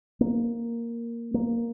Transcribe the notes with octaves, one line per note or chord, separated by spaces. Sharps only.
A#3
A#3